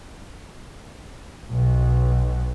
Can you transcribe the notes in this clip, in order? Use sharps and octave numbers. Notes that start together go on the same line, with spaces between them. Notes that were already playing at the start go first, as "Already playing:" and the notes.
B1 B2